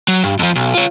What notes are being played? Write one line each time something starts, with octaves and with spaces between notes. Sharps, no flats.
F#3
G2
F2 F3
B1
F4 C#5